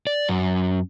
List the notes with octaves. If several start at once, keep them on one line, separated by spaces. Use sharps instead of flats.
D5
F#2